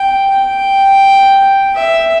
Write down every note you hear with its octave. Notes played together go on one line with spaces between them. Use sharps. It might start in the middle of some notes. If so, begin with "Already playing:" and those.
Already playing: G5
G5
E5